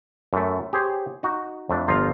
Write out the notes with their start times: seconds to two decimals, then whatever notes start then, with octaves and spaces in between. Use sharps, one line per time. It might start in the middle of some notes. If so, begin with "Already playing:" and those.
0.33 F#2 A3
0.73 G4 G#4 C5 C#5
1.23 D#4 F#4
1.69 F2 A3 D4
1.88 G1 F3 F4 F5 A#5